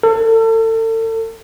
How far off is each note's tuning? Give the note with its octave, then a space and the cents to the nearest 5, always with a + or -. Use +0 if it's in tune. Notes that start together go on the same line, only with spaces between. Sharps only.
A4 +35